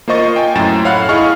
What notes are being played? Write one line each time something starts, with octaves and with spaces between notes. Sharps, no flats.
A#3 F4 C5 D#5 C#6 A6
G5 G#5
F#2 A2 A#5 A6 E7
C#5 F5 F#5 B5 F6 F#6
E4 G#4 D#5 C#6 F6